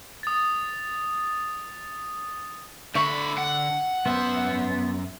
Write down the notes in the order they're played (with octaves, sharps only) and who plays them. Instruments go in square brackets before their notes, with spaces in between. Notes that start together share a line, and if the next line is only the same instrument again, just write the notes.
[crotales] D#6 A6
[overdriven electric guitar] D2 B5 [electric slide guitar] D3 [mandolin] E5 C#6
[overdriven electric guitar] F#5
[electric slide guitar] F#2 E5 [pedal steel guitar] B3 [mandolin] C5